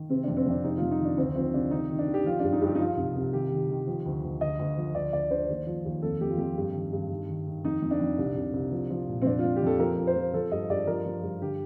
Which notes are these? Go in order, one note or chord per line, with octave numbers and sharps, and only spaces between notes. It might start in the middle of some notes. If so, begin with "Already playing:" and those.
Already playing: D#3
C3 C4
F2 D4
C4
F2 D4
C3 D#4
F2 F4
D#4
D#3
D4
D2 C4
F3 C4
C3 D4
D#3 D#4
D#3
D4
D#3
G4
F3 F4
G2 D4
D#4
G2 G4
D#4
F3 F4
C2
C2
D#3 G4
D#3
D#3
F3
D2
D2
D2 D#5
D2
F3
D2 D5
D2 D5
D3 C5
D#2
F3
D#2
F2 A4
F2 G4
F4
F2 G4
G2
D#3
G2
D#3
D#3
D#3
F2 D#4
F2
D4
F2
C2
C2
C2
F3
F3
A#2
C4
F2 D4
F4
F2
G4
F2 A4
F3 A#4
F3
C5
F3
F3 A4
G2 D#5
G2 D5
F3 A#4
F3
G2
D3 G4